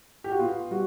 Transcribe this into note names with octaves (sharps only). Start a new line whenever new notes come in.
G4
F#4
B3 F4
G3 F#4